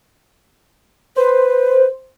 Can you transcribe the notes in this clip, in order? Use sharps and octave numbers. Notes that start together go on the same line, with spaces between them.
B4 C5